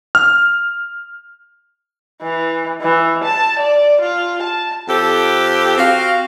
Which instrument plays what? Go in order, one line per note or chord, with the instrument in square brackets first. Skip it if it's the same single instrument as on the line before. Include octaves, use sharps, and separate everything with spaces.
[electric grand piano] F6
[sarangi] E3
E3
A5
D5
F4
A5
[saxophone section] F2 G4 A4 C5
C4 F#4 F5